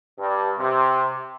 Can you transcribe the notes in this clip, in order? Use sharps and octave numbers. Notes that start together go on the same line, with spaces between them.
G2
C3